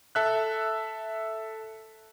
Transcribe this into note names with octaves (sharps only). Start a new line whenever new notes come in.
A4 E5 F#6